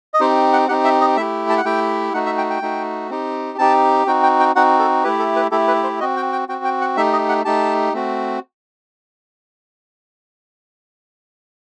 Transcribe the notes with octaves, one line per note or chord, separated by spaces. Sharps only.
D#5
C4 D#4 G4 C5
F#5
C4 D#4 G4 F#5
E5
D#5
A3 E4 G4 E5
A5
F#5
A3 E4 G4 G5
A3 D#4 F#4 F#5
E5
G5
G5
A3 D#4 F#4
C4 D#4 G4
C4 D#4 G4 A5
C4 D#4 F#4 G5
G5
G5
C4 D#4 F#4 F#5
A4
A3 E4 G4 B4
A4
B4
A3 E4 G4 A4
B4
C5
C4 F#4 D#5
G5
G5
C4 F#4 G5
G5
F#5
A3 D#4 G4 E5
D#5
F#5
A3 D#4 G4 A5
A3 C4 F#4